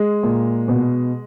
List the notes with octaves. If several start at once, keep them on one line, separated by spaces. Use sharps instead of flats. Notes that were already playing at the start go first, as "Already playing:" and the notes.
Already playing: G#3
A#2
B2